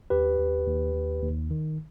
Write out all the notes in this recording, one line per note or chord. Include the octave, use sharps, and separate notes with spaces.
D#2 G4 B4
D#2
D#2
D#2
D#2
D#3